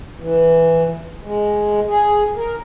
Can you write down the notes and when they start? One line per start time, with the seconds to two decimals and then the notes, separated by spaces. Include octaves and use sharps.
0.20 E3
1.23 G#3
1.88 G#4
2.37 A#4